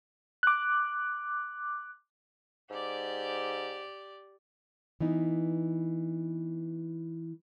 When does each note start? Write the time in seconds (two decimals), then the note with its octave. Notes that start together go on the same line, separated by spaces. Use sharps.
0.43 D6 F#6
2.70 G#2 G4 D5
5.00 E3 B3 D#4